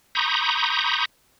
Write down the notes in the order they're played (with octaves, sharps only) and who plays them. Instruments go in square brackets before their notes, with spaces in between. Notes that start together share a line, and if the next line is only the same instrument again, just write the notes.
[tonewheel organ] A#5 B5 C#6 D#6 G6